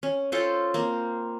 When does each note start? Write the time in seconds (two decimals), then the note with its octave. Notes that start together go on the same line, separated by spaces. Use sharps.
0.03 C#4
0.32 C#4 F4 A4 C5
0.74 A#3 C4